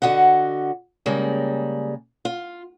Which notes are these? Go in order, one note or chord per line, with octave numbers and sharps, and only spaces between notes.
D3 F#4 D#5 F#5
C#3 G3 G#3 A#3
F4